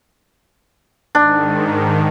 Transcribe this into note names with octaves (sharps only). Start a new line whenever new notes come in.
G#2 D#3 D4